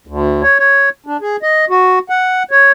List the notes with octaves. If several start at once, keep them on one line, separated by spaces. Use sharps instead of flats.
D2
C#5
C#5
D4
G#4
D#5
F#4
F#5
C#5